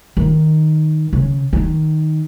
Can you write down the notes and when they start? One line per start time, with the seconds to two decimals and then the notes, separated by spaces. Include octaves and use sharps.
0.17 D#3
1.13 C#3
1.53 D#3